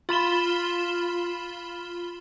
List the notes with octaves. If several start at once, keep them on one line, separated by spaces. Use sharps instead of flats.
F4 B5 E7 G7